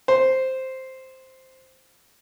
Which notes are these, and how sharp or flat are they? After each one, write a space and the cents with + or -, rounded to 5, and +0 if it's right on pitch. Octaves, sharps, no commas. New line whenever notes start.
C5 +0